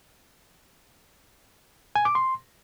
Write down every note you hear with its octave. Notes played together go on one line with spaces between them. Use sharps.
G#5
D6
C6